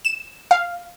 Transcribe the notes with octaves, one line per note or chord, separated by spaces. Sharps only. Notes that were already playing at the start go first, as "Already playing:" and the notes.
E7
F5